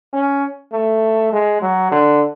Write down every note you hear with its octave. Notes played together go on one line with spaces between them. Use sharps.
C#4
A3
G#3
F#3
D3